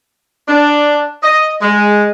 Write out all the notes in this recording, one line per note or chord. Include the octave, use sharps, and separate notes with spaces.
D4
D#5
G#3